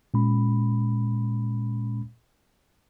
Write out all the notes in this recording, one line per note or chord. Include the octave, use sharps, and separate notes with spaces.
A#2 G#3 C#4 B5